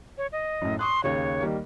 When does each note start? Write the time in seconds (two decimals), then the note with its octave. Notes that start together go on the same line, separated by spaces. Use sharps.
0.18 C#5
0.32 D#5
0.61 F#2 A2
0.79 C6 C#6 D#6 F#6
1.04 D#2 C#3 C#5
1.41 D#3 G3 A#3